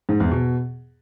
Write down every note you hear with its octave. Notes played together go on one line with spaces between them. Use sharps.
G#2
E2
B2